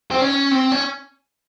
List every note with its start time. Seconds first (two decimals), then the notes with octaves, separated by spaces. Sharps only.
0.11 C4
0.21 C#4
0.51 C4
0.72 C#4